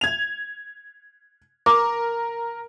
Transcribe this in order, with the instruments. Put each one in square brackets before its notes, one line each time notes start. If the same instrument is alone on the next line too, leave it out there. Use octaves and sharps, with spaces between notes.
[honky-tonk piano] G#6 F7
[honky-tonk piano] A#4 [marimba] D6